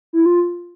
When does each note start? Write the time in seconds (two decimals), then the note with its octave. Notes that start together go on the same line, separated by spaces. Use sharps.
0.13 E4
0.26 F4